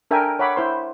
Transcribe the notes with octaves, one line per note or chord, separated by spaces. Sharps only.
D4 A4 A#4 E5 G5 G#5
C#5 E5 F#5 B5 D6
E4 C5 C6